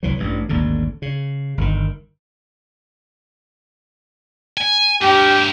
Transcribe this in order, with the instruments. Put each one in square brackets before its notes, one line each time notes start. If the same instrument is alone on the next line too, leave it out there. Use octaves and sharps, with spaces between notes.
[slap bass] C2 E3 F#3
A1 G2
A1 D#2 G#2 D3
C#3
G1 B2 D#3
[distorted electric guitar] G#5
[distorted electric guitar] G2 A#4 [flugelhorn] G4